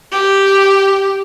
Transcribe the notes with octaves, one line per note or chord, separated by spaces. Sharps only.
G4